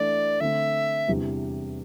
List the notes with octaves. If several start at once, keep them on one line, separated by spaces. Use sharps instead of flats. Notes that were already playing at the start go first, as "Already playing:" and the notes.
Already playing: E3 A3 D4 D5
D3 A3 C4 E5
E2 C3 E3 G3 D4